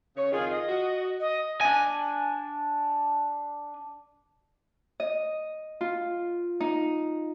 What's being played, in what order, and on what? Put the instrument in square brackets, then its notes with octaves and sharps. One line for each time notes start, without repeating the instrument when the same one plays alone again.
[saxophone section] C#3 C#5
[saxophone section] F2 D#3 F4 [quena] G#4
[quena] D#5
[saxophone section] F#4
[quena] D#5
[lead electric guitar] D4 G#5
[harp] D#5
F4
D#4